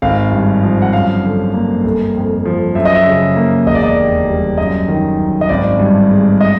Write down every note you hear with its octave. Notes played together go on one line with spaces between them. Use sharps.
G#1 F5
G2
F3
F#5
F#2 F5
D3
A#3
G1
F2
F3
F#2 E5
D#5
E5
C#3
A#3
E1 D#5
D5
D#5
D#2
G3
F#2 D#5
D#3
F#2
D#5
G#1 D5
G2
G#3
D#5